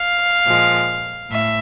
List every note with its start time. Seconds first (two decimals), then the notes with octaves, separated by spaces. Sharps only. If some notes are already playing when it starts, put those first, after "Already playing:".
Already playing: F5
0.46 A#2 F3 G#3
1.31 A2 E5